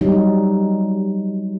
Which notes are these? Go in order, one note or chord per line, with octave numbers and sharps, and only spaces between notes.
F#3 G3 D#4